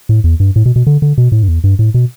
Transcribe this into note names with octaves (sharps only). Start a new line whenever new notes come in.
A2
E2
G2
A2
B2
B2
D3
D3
B2
A2
G2
E2
G2
A2
B2